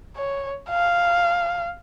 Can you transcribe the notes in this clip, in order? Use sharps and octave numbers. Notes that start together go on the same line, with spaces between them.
C#5
F5